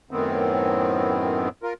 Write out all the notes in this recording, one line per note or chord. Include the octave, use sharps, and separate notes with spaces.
F#2 A2 D#3 B3 C4
F4 A#4